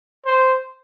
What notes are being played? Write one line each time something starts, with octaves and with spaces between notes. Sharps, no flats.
C5